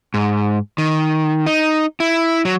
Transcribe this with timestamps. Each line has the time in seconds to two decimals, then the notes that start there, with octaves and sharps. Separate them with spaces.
0.14 G#2
0.78 D#3
1.47 D#4
2.00 E4
2.45 F#3